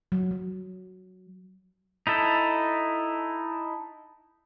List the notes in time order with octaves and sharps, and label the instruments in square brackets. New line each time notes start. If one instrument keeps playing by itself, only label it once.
[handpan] F#3
F#3
[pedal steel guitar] D#4 E4 A4